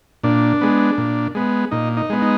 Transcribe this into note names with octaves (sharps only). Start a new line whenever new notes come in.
A#2 D4
G#3 B3
A#2
G#3 B3
A#2 D#4
D#4
G#3 B3
D#4